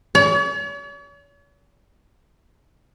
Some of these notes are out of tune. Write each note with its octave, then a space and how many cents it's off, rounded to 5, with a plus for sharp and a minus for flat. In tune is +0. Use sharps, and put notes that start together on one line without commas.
C#5 +45